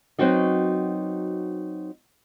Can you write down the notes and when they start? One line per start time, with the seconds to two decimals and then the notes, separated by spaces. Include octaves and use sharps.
0.19 F#3 B3 C4 D#4 F#4 D#5